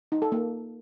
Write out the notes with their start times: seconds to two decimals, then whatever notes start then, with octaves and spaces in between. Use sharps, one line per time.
0.12 D#4
0.22 A4
0.32 A#3